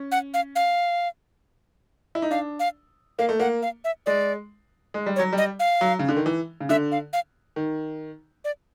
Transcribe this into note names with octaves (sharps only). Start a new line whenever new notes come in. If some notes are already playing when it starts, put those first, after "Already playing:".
Already playing: C#4
F#5
F5
F5
E4
D#4
D4 F5
F5
A#3 F5
A3
A#3 F#5
F5
E5
G#3 D5
G#3
G3
C#5
F#3
G3
D#5
F5
F#3
C#3
D3
D#3
E3
C#3
D3 E5
F5
F5
D#3
D5